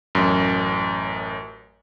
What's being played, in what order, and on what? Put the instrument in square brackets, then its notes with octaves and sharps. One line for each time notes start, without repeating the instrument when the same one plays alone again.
[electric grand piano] A1 F#2